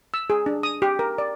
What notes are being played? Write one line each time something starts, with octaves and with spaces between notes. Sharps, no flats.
E6
G#4
D4
D#6
G4
A#4
D5